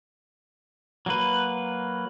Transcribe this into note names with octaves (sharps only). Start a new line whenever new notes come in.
F#3 A#3 B4